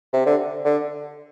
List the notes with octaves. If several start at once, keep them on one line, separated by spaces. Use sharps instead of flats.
C3
D3
D3